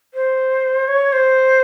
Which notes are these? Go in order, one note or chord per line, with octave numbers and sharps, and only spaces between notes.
C5
C#5
C5